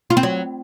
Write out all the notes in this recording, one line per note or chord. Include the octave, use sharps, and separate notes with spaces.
F4
C4
F#3